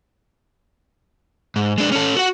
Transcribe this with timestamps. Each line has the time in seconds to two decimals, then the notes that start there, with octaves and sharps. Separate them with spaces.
1.56 G#2
1.78 G#3 D4
1.92 C#4 A4
2.17 F#4 F#5